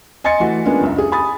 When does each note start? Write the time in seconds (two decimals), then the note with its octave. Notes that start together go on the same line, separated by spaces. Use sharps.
0.24 D#5 G#5 C6 A6 C#7
0.40 E3 A3 F#4
0.65 G#3 A#3 B3 C#4 D4 F4
0.81 F#1 C#2 E5
0.98 G#4
1.12 G#5 B5 D#6 A6